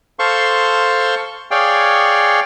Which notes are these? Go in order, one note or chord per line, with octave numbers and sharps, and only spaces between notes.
A4 C5 F5 C6 C#6
G#4 C#5 D5 F5 G5